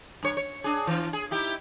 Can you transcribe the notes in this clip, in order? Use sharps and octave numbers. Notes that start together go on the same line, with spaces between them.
G2 C#5
C#5
D4 G#4
E3 F4
G#4
D#4 E4 G4